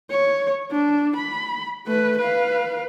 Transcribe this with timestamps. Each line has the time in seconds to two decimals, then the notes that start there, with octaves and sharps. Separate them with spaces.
0.11 C#5
0.71 D4
1.16 B5
1.86 A3 B4
2.18 B4 F5